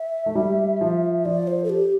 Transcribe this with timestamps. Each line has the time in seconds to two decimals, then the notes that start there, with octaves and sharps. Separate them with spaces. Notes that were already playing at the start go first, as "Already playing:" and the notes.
Already playing: E5
0.26 A3
0.35 G3
0.81 F3
1.25 F3 D5
1.47 C5
1.64 A4
1.70 G4